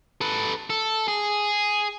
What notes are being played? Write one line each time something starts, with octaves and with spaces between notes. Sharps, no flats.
A4 B4
A4
G#4